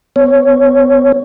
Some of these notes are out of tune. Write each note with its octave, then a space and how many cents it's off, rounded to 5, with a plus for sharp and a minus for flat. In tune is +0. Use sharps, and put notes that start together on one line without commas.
B3 +40 C#5 +0